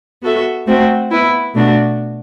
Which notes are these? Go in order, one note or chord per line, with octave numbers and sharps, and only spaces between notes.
B3 F#4 A4 E5
A3 C4 F#4
B3 E4 B4
B2 A3 D4 F#4